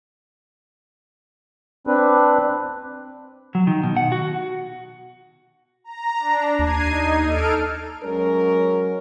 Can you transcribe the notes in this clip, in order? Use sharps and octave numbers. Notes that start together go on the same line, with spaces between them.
C4 D4 B4
F#3
D#3
B2
F#5
F#4
A#5
D4
D#2 G#6 C7 D#7
D#4
A4 F6 D7
F#3 G#3 C#4 A#4